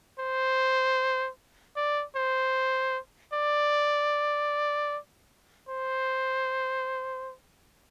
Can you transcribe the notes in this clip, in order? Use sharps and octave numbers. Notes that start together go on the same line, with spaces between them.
C5
D5
C5
D5
C5